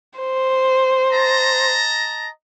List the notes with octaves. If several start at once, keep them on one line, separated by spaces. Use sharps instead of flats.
C5
D#5 A5 A#5